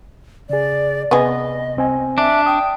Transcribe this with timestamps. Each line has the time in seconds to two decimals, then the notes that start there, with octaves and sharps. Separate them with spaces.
0.50 C#3 G#4 D5
1.11 C3 B3 G#4 D#5
1.77 C2 C4 G#5
2.18 D4 E5
2.46 G5 D#6